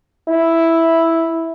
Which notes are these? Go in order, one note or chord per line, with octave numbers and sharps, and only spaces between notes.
E4